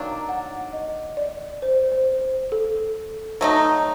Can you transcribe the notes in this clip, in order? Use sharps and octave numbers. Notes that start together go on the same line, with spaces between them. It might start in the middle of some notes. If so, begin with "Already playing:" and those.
Already playing: D#3 F#3 A#3 D4
F#5
D#5
D5
C5
C5
C5
A4
F#3 A3 D#4